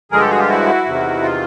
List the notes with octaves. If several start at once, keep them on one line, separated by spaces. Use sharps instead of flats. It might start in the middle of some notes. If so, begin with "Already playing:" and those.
G2 D3 F3 G#3 G#4 A#4
G4 A4
F#4 G#4
F4 G4
E4 F#4
E2 C3 D#3
F4